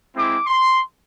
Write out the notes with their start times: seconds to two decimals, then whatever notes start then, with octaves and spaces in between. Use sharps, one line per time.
0.15 G#3 C4 E4 D6
0.46 C6